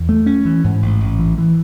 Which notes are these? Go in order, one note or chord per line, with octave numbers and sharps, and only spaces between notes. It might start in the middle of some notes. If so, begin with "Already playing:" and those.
Already playing: E2
A3
C#4
E3
G#2
A1
A1
E3
E3